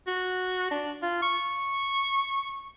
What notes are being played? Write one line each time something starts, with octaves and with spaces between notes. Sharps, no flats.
F#4
D4
F4
C#6